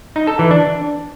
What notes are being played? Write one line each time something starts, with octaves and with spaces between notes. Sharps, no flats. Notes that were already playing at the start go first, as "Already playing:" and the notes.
D#4
A4
E3
D4